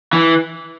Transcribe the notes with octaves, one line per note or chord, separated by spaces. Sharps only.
E3